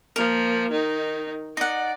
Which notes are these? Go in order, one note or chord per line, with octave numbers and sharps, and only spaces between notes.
F3 A#3 A#4
D#3 D#4
D#4 D5 F#5